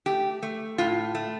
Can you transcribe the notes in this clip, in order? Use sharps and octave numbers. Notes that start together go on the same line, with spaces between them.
A3 G4
A3
A2 F4
A3